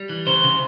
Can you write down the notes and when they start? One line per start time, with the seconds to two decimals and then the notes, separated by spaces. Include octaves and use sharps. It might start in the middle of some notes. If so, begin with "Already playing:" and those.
Already playing: G3
0.09 E3
0.27 C#3 C5
0.44 C#3